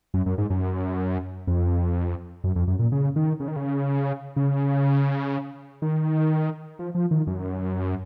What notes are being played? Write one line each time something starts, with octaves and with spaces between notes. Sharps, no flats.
F#2
F#2
G#2
F#2
F2
F#2
F2
F#2
A#2
C#3
D#3
C#3
D#3
C#3
C#3
D#3
F3
F3
D#3
F#2